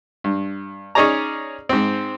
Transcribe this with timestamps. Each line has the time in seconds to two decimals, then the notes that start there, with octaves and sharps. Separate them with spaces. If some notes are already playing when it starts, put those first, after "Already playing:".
0.24 G2
0.95 C#4 D#4 G#4 C#5 D5 A#5
1.69 G#2 C4